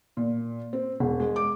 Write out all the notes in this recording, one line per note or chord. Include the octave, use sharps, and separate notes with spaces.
A#2
C4
E1
G#3
D6